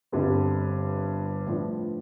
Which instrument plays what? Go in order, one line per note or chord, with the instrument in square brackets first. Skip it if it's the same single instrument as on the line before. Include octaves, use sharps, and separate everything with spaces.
[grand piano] G1 G2 D3 G3 C4
A2 F3 B3 D4 F4